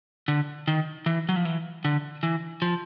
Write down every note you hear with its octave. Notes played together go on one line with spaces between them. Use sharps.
D3
D#3
E3
F#3
F3
E3
D3
E3
F3